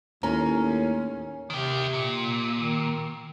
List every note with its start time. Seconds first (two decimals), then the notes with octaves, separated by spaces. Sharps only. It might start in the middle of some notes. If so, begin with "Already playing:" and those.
0.23 D#2 A2 C#4 A#5
1.50 C3 D#3 G4
1.93 A#2
2.55 D#3